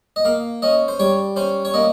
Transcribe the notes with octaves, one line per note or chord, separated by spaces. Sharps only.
D#5
A#3 F5
C#4 D#5
C5
G3 C#5
C#4 C5
C#5
A#3 D#5